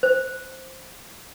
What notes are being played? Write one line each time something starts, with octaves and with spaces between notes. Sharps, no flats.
C5